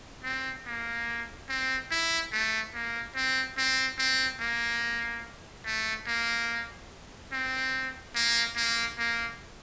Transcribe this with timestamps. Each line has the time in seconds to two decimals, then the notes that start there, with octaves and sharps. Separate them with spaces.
0.24 C4
0.66 A#3
1.49 C4
1.91 E4
2.32 A3
2.74 A#3
3.15 C4
3.57 C4
3.98 C4
4.40 A#3
5.65 A3
6.07 A#3
7.32 C4
8.15 A#3
8.56 A#3
8.98 A#3